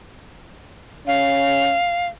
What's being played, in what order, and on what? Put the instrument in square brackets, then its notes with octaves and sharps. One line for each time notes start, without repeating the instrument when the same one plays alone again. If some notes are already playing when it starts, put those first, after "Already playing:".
[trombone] C#4 [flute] F5